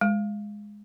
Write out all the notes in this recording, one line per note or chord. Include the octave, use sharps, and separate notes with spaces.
G#3